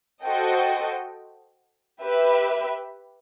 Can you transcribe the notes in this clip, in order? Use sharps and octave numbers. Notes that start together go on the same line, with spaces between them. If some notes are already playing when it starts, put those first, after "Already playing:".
F#4 A4 C5 D#5 G5
G4 B4 E5